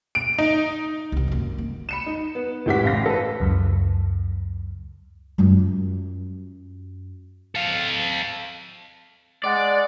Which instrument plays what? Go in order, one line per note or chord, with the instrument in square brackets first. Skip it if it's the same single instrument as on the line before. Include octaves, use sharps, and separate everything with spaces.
[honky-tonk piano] D7
D#4
[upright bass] C2 C3
F#2 A#3
D#3
[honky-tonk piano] B5 C#7 E7
D#4
B3
C#2 A2 A3 G4 F#5 B6
A1 F5 A#6
A4 B4
[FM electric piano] C#2 F#2
[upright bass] F#2 F4
[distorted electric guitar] A4 F5
[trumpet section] G#3 F#5 [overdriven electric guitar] D5